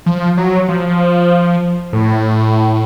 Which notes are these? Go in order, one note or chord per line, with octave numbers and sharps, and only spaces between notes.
F3
F#3
F3
A2